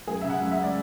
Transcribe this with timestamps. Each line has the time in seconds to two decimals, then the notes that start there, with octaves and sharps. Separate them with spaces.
0.07 F#2 G#4
0.21 C#3 E5
0.30 F#5
0.41 F#2
0.52 E5
0.57 G#3
0.63 D5